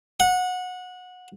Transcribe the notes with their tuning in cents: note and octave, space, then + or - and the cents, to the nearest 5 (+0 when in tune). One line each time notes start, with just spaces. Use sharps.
F#5 -20